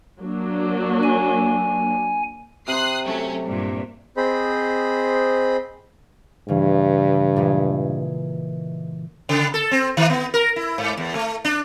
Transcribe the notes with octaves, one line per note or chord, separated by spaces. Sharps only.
F#3 A#3 D4
G#5
C3 C5 D#6 F#6 C7
F#3 A3 C#4
G2 A#2
C4 G#4 C5 D#5 B5
G2 C#3 E3
A#2 E3 G#3
C#3
A4
C4
D#3
B3
A#4
E4
G#2
E2
A3
D4